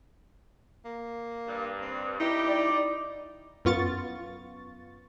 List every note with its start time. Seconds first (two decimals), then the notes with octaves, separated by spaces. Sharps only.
0.85 A#3
1.47 G2
1.82 C4
2.20 G3 D#4 E4 G4
2.49 D5
3.65 F#2 B3 F4 C#6 A6